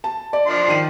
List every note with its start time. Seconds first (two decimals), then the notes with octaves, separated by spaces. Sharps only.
0.04 A5
0.33 D5
0.47 F3 D4 C6
0.68 D#3 D#7